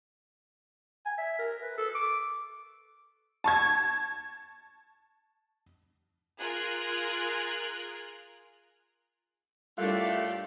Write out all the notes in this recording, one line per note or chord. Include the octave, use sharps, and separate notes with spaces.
G#5
E5
A#4
B4
A4
D6
A5 C#6 G#6
F4 G#4 A#4 F#6
A2 G3 A3 D4 F4 G4 A#4